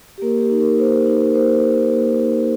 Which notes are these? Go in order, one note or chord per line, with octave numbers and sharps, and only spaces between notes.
G4
A#3 A#4
G4
D#4
A#4
A#3 C5
D#4
A#4
A#3 C5
D#4
A#3
D#4